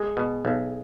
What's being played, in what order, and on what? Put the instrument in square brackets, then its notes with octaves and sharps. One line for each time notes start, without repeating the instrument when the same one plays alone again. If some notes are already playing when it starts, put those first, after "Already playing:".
Already playing: [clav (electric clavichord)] G#3 [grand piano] G#4
[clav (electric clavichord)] B2
B1